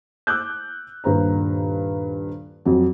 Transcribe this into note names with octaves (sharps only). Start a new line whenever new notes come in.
D6 E6 F#6 G6
D#1 G2 C5 A#5
F2 F#3